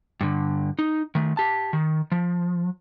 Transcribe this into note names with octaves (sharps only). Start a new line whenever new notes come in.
G2 D3
D#4
D#3 A3
G4 A5
D#3
F3